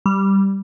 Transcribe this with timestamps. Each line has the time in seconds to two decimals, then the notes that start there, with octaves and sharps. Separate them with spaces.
0.06 G3